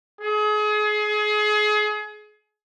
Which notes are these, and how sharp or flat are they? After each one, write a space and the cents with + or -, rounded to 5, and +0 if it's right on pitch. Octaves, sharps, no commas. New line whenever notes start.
G#4 +30